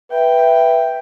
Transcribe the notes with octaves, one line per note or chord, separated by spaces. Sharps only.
B4 E5 G5